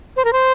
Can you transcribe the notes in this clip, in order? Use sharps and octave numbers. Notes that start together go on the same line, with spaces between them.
C5
A#4
C5